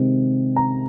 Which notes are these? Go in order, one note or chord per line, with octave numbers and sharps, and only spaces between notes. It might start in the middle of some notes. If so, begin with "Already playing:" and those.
Already playing: C3 D#3 G#3 C4
A#5